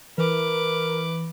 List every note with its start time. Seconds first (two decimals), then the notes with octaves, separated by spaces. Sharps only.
0.18 E3 A#4 B4 D6